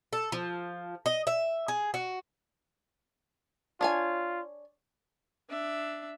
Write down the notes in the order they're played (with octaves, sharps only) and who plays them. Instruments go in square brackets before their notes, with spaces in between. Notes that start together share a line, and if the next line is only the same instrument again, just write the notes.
[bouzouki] A4
F3
D#5
E5
G#4
F#4
[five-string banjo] D4 C#5 G#5 [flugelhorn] F4
[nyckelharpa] D4 E5